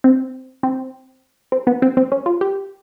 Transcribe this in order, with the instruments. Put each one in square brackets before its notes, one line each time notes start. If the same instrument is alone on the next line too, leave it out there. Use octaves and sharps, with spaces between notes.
[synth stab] C4
C4
C4
B3
C4
C4
C#4
F4
G4